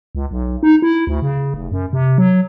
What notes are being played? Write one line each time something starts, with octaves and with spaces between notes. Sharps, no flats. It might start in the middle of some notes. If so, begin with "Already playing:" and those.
C#2
B1
D#4
E4
D2
C#3
F1
F#2
C3
F#3